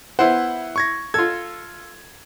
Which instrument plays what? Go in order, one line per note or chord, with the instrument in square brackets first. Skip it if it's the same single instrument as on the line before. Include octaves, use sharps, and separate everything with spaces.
[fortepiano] B3 E4 C5 [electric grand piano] F#5
[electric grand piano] C#6 G#6 A#6
[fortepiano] F4 A4 [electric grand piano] G#6